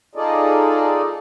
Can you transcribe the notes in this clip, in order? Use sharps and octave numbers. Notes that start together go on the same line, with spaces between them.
D#4 F4 G#4 A4 D5 D#5